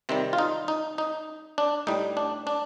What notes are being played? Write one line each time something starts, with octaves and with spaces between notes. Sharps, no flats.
C3 D#3 G3 C4
F4
D#4
D#4
D#4
D4
A2 G3 D#4
D4
D4